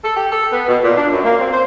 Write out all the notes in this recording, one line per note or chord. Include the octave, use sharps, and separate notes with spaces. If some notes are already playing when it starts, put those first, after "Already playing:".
A4
G4
A4
B3
B2
A#2
D4
F#2
A#3
C4
C5